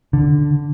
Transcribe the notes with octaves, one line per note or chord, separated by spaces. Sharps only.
D3